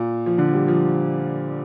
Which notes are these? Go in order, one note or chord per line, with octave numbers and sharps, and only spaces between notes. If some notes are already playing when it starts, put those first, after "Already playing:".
Already playing: A#2
F3
D3
G3
F3